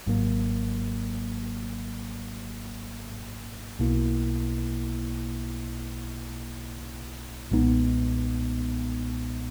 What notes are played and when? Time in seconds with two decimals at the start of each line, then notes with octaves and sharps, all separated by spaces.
0.07 G#1 G#2 F#3 A#3
3.79 B1 B2 A#3 E4
7.51 B1 A#2 G#3 B3 D#4